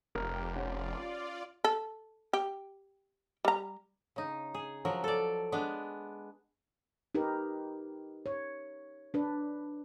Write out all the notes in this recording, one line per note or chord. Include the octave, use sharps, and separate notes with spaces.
F1 G4 A#4
C#4 F4 D5 F#5
A4
G4
G3 A#5
C#3 D#4
G#4
F3 F#3 A#4
A4 D5
G#3 B3 D4
D#4 G4 A#4 B4
C#5
D4 B4